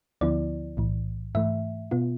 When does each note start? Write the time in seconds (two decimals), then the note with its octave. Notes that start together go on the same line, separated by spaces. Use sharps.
0.21 D2 D3 F3 B3 E4 D5
0.77 B1 A2 E3
1.35 G#2 E3 A3 E5
1.91 B2 B3 F4